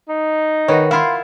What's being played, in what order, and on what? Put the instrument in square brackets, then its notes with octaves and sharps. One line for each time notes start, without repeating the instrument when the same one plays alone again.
[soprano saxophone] D#4
[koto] D#3 F#4 [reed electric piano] B4 C#5
[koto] E4 F4 [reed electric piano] F5 B5 C6